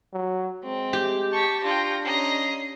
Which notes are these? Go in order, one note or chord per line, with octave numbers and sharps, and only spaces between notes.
F#3
G#3 C4
G4
A5 C#6 B6
D4 F4 G5 A#6
C#4 D#5 A#5 C7